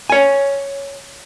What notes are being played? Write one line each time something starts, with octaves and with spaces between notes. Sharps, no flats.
C#5 G#5